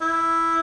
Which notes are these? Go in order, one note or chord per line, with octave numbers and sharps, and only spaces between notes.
E4